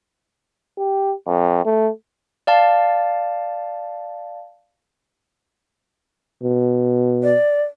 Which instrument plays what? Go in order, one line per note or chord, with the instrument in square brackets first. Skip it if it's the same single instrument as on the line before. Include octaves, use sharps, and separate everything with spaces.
[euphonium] G4
F2
A3
[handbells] D5 F5 A5 A6
[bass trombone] B2
[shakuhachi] D5